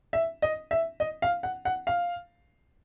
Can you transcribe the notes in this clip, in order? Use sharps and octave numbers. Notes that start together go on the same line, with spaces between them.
E5
D#5
E5
D#5
F5
F#5
F#5
F5